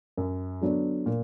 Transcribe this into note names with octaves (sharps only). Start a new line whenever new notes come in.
F#2
D3 F#3 B3 D4
A#2